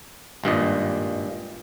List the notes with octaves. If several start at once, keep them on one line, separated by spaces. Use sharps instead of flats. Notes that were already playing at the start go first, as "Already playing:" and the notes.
G#1 G2 A#2 D#5